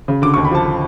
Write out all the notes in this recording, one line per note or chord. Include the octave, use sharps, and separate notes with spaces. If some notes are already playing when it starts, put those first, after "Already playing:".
C#3
D3 D6
D#2 C#6
B5
F3 A5